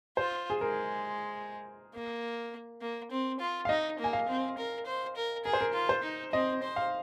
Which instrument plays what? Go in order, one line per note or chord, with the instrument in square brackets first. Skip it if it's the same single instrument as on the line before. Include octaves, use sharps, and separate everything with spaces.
[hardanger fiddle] F4 [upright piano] C5
[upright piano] G#4
[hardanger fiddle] G#3 [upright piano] A#4
[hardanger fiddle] A#3
A#3
C4
F4
[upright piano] F5
[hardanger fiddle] D#4 [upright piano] D#5
[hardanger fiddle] A#3
[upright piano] G#5
F5
[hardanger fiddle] C4
A#4
C5
A#4
[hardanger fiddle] G#4 [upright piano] A#4
[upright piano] C5
A#4
[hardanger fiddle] F4
[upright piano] C5
[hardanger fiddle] D#4
[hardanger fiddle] C4 [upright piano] D#5
[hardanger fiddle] C5
[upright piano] F5